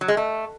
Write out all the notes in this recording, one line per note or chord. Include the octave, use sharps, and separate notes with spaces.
F#3
G#3
A3